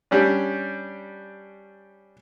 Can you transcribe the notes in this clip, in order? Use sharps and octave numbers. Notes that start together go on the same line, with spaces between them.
G3 C#4 D4